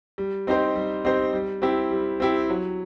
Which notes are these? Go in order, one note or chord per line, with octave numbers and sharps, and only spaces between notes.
G3
C4 D#4 G4 C5
G3
C4 D#4 G4 C5
G3
C4 E4 G4
G3
C4 E4 G4
F#3